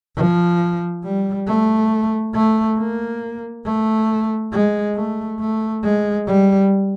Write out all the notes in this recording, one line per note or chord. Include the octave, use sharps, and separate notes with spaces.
F3
G3
A3
A3
A#3
A3
G#3
A3
A3
G#3
G3